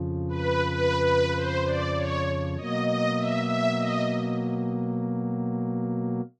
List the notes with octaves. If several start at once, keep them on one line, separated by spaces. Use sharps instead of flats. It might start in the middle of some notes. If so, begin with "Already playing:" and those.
Already playing: F2 C#3 F3
B4
B4
B4
C5
D5
C#5
B2 F#3 A#3 D#5
D#5
E5
E5
D#5